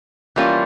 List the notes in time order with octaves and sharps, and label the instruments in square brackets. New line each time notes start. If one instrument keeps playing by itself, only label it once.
[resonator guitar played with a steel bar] E3 G3 A#3 C#4 F4